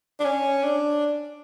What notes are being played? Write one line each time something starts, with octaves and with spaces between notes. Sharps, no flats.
D4
C#4
D4